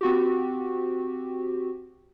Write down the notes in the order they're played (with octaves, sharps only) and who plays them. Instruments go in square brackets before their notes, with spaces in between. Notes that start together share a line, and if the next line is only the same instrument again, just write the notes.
[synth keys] C4 F#4 G4